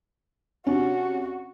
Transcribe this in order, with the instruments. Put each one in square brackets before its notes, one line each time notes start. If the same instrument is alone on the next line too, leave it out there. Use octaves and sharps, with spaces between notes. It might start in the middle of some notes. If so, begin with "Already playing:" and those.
[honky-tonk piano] C3 C#4 D4 [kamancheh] F#4